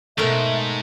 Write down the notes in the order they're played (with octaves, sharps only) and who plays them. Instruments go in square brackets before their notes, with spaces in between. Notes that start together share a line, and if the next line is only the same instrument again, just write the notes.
[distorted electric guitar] E2 G#2 [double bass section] B2 [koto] A3 A#4 [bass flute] E5